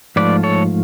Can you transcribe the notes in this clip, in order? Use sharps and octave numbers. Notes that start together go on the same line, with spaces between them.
G#2 F3 A3 F4 B4 D5
A4 C#5